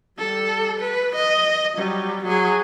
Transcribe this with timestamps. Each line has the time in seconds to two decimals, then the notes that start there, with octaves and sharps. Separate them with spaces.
0.19 G3 A4
0.80 B4
1.15 D#5
1.75 F#3 G3
2.24 F#3 G#4